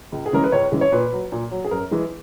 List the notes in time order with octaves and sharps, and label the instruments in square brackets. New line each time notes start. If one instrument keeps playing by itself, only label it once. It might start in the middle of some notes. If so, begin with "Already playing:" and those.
[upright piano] C#2
G#4
C#3 E3 G#3 A#4
B4
C#2 C#5
C#3 E3 G#3
C#5
A#2 B4
F#3
A#2
F#3
G#4
F#2 A#4
E3 G#3